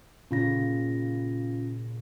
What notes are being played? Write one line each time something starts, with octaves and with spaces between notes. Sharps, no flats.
A#2 C#3 C#4 F4 A#6